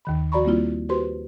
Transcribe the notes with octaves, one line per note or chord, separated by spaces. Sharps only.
D#2 D#3 B5
F3 F#4 D5 A#5 B5 C#6
G3 A#3 C4 E4 F4
F#4 G4 B4 C5 C6